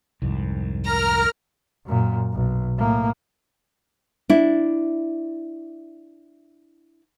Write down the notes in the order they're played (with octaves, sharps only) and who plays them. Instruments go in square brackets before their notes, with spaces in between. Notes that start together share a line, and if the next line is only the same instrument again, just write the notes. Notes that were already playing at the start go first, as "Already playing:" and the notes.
[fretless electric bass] C2 F2 G#2
[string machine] A#4 F6 [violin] A#5
[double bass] F#2 A#2
B1
A2 A#3
[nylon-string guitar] D4 E4